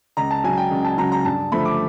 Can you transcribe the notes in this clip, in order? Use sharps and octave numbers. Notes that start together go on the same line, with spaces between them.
C#2 A#5
A5
C#3 F#3 G#5
G5
C#2
A5
C#3 F#3 A#5
A#5
G2 A5
D3 F3 A3 B5
D6